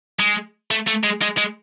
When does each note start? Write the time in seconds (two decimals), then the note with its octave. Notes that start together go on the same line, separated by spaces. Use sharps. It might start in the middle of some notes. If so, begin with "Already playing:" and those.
0.19 G#3
0.71 A3
0.87 A3
1.03 G#3
1.22 G#3
1.37 G#3